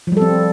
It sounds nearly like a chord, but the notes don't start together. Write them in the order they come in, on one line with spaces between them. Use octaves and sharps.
F3 G3 A4 C4